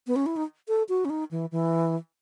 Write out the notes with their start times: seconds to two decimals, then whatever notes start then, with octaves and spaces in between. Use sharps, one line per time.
0.07 B3
0.16 C#4
0.26 E4
0.36 D#4
0.68 A4
0.89 F#4
1.05 C#4
1.10 D#4
1.31 E3
1.52 E3